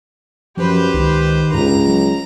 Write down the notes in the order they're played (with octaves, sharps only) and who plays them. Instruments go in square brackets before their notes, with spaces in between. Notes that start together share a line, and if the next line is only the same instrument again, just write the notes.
[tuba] F#2 [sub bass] F3 [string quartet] G4 B4 C5
[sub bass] C#2 [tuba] D#3
[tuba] C#2 [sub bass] G2 [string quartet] A#5
[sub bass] F#3